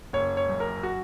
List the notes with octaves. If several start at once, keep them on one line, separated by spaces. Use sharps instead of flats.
F#1 C#5
C#5
F#2
A#4
F#4